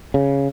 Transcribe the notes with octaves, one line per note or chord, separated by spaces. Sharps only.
C#3